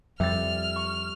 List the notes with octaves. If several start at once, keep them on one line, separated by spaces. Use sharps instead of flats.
F2 G3 E5 F6 A6
C#6